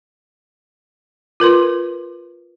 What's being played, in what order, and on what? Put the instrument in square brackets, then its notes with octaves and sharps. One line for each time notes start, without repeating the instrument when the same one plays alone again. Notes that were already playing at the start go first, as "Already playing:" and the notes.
[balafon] F4 A#4 B4 C6